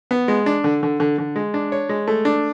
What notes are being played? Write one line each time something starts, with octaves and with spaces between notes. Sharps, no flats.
B3
G#3
D4
D3
D3
D3
D3
G#3
D4
C#5
G#3
A3
D4